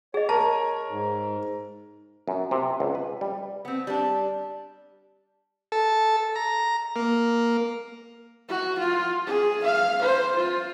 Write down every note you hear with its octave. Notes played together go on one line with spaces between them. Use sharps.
G#4 C#5 D#5
A#4 A5
G#2
F#2
C3
C#2
B4
G3
B3 C4
G3 D4
A4
A#5
A#3
F#4
F4
G#4
F5
C5
F4